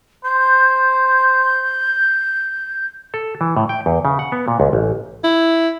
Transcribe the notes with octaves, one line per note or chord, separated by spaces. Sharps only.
C5 G6
A4
E3
A2
G5
E2
C#3
F#5
B3
A#2
C#2
A1
E4